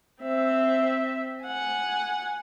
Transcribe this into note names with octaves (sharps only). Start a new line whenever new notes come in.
C4 E5
F#5 G#5